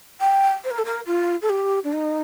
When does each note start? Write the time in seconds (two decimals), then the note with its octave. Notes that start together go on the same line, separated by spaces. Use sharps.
0.20 G5
0.64 C5
0.70 A#4
0.78 A4
0.85 A#4
1.06 F4
1.41 A4
1.49 G4
1.84 D4
1.92 D#4